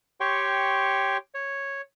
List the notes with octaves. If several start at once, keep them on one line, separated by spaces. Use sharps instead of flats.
G4 C#5 G5 C6 C#6
C#5